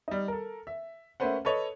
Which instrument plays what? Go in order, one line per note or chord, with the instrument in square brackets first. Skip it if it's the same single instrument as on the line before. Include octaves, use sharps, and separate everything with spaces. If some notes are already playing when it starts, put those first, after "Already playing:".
[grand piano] G3 D#4
A4 A#4
E5
A3 A#3 C#4 B4 C5 F#5
A4 B4 C#5 D#5